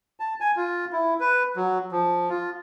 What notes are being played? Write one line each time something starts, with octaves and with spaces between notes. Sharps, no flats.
A5
G#5
F4
E4
B4
F#3
F3
F4